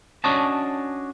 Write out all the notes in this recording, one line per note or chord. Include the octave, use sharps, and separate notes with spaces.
C#4 D4 F#4 C#5 D#5 A5